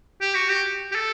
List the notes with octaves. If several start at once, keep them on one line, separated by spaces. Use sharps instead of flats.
G4
F#4
G4
G4
A4